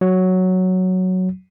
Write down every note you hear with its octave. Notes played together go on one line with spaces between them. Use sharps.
F#3